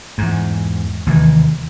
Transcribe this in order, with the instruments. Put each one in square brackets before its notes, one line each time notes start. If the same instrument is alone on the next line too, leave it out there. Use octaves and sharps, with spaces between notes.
[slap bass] E2 G#2
D#2 C3 E3